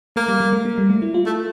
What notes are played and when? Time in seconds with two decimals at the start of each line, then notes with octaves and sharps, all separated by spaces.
0.16 A3 A#3
0.28 G3
0.40 G3
0.53 A3
0.65 A#3
0.78 G3
0.90 A3
1.02 E4
1.14 F4
1.26 A3